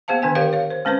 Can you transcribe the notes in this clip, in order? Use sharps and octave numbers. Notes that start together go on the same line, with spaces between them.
A#3 B3 G#4 C5 F5 A5
D3 D#3 D4 G5 G#5
G4 A#4 C#5 F5 G5
C#5 F5
C5
G#3 C4 C#4 B4 C5